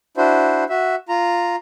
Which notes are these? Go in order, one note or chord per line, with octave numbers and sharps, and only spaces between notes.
D4 E4 F#4 C5
F#4 E5
F4 A#5